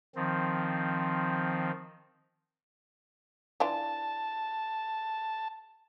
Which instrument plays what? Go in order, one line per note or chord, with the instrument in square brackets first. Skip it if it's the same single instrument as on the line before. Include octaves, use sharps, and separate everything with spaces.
[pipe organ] D#3 F3 C4
[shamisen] E3 D4 F4 [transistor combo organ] A5